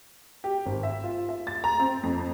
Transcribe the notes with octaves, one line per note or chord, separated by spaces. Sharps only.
G4
G#1
E5
F4
E5
A6
A#5
C4
F2